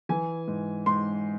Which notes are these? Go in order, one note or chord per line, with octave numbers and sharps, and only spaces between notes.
E3 G#5
G#2
G#2 C6